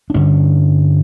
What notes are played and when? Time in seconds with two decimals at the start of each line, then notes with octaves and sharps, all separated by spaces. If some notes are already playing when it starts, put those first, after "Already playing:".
0.10 D4
0.14 G2 D3 C#4